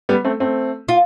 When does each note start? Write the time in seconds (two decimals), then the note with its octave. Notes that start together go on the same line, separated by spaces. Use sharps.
0.09 G3 B3
0.25 A3 C4
0.40 A3 C4
0.88 F4